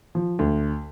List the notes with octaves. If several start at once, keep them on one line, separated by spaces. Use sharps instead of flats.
F3
D2